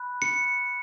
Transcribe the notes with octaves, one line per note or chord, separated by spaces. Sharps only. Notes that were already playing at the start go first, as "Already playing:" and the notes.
Already playing: B5 F#6
C#7